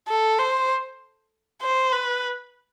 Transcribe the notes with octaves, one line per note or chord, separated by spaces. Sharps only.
A4
C5
C5
B4